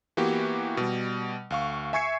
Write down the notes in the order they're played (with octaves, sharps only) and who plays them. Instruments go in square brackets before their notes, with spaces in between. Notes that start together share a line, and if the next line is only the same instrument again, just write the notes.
[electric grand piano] E3 A#3 B3 F#4 G4
B2 G3
D2 F5 C#6
E5 G#5 C#6 G#6 C7 C#7